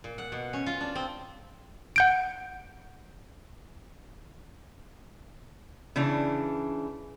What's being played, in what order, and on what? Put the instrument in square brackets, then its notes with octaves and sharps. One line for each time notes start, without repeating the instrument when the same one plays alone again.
[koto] A#2
F#5
B2
C#4
F4
D4
C4
[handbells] F#5 G6 D7
[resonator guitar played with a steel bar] C#3 E3 D4